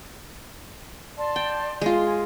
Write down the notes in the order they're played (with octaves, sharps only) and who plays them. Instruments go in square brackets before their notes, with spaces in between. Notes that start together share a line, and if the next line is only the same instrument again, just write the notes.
[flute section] D5 A5 C6
[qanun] G5
G#3 F4
[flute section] G#5